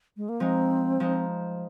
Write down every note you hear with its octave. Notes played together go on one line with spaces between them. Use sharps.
G#3
A#3
F3 G#3 C4 D#4
F3 G#3 D#4